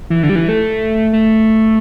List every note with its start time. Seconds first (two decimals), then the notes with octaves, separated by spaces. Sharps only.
0.10 E3
0.23 D3
0.29 G3
0.36 E3
0.49 A3
1.13 A3